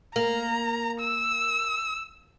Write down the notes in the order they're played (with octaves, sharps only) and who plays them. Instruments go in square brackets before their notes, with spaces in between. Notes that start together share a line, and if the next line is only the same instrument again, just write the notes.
[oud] A#3 [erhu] A#5
[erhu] E6